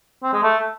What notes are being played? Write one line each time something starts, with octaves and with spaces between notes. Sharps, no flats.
C4
G#3
A3